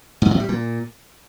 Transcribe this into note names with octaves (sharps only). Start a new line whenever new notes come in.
G#2
A2
G3
A#2